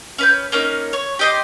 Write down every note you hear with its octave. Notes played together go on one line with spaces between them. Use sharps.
C#4 B4 G6
A#3 C#4 D#4
C#5
G4 D#5 C6